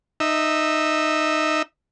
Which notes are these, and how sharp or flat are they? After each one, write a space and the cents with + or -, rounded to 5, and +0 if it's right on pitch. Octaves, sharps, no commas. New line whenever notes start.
D#4 -15 E5 -15